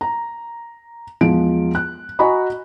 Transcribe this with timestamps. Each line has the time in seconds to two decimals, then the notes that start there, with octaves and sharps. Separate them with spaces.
0.01 A#5
1.21 E2 F3 G#3 D7
1.75 F#6
2.19 F#4 D#5 G#5 A#5 B5 C#6